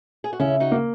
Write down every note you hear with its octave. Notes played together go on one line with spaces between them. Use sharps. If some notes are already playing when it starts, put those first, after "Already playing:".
G#4
F#4
C#3 C#4 E4
D#4 F#4
A#3